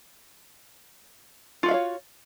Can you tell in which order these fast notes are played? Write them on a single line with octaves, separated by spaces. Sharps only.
F4 F#4 F5 E5 C#5